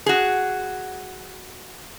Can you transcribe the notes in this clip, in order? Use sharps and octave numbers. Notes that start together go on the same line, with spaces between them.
F#4 G#4